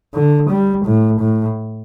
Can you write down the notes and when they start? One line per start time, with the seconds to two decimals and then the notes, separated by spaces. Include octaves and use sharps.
0.14 D3
0.50 G3
0.86 A2
1.20 A2